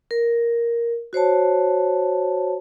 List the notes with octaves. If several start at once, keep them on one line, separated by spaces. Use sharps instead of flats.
A#4
F#4 C5 C#5 A5